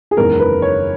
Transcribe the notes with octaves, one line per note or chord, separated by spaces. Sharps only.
G#4
F#1 E2 D#3 G#3 A#4
B4
C#5